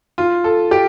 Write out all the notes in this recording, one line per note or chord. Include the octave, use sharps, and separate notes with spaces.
F4
A4
G4